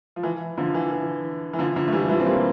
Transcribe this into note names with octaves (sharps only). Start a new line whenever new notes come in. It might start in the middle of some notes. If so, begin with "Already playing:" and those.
F3
E3
D3 F3
E3
E3
E3
D3 F3
D3 F3
A3
E3 G3
F3
E3 G3
C4
G3 A#3